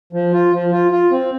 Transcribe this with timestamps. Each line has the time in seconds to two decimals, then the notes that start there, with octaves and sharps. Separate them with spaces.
0.13 F3
0.33 F4
0.52 F3
0.72 F4
0.92 F4
1.11 C4